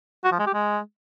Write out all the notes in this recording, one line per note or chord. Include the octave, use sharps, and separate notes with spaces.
F#4
F3
G#3
G4
G#3